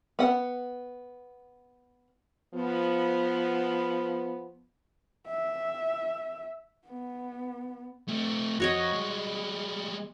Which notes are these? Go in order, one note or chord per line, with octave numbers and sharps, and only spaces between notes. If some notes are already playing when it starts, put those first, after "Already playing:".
B3 F#5
F3 B3
E5
B3
A3 C4
F2 F#4 C#5 D#5
G3 G#3